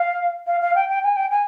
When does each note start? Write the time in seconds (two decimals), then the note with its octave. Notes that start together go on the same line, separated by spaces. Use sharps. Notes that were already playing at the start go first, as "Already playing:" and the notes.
Already playing: F5
0.47 F5
0.62 F5
0.75 G5
0.89 G5
1.03 G#5
1.16 G5
1.31 G#5